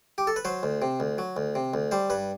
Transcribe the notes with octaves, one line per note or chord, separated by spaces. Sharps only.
G4
A4
B4
F#3 C5
D2
C3
D2
F#3
D2
C3
D2
G3 C5
G2 B4